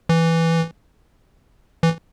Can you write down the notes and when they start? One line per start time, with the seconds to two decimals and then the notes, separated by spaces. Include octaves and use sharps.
0.09 E3
1.83 E3